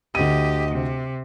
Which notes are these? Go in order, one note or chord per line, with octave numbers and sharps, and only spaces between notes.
D2 G4 D#5 D#7
C3